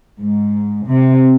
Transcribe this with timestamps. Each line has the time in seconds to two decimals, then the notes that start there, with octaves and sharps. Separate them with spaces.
0.20 G#2
0.87 C3